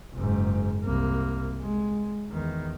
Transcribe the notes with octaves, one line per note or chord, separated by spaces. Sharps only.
F#1 G#2
C2 A#3
G#3
E2 D#3